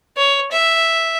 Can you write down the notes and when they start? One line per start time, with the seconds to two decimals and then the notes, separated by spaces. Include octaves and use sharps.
0.17 C#5
0.51 E5